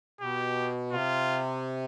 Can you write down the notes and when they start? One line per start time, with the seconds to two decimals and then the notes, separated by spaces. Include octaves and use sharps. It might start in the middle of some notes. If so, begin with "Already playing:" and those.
0.21 B2 G4
0.92 C3 F4